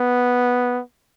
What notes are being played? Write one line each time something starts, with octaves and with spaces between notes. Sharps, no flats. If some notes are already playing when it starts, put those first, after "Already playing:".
Already playing: B3